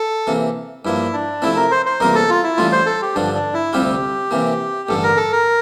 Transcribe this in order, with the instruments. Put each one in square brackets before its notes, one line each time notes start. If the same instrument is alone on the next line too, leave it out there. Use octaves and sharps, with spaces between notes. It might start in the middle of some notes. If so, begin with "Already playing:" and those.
Already playing: [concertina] A4
[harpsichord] C3 E3 A#3
[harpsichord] G2 F3 A#3 [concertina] E4
[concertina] D4
[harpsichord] C3 F3 A3 C4 [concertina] E4
[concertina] A#4
C5
C5
[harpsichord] E2 C3 G3 A#3 F4 [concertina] A#4
[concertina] A4
F4
E4
[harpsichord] A1 A2 G3 D4 [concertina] F4
[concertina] C5
A4
G4
[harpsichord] G2 D3 F3 [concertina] D4
[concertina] D4
E4
[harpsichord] D2 C3 G3 C4 F4 [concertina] G4
[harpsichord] C3 E3 A#3
[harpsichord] A1 G2 D3 [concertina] A4
[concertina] A#4
A4
A#4